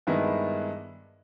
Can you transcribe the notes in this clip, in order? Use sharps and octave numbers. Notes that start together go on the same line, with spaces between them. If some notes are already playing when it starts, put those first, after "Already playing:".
G2 D#3 G#3 B3 E4